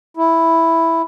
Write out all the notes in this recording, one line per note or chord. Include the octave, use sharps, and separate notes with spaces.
E4